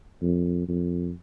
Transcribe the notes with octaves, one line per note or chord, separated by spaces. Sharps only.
F2
F2